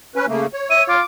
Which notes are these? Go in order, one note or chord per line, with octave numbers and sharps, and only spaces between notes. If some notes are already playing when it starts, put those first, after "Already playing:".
C#4 B4
C#3 A3 A#3
C#5
E5 D#7
F4 D6